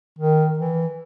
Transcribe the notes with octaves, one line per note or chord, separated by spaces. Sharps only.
D#3
E3